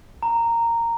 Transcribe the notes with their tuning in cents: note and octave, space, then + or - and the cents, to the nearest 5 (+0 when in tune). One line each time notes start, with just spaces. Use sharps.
A#5 -10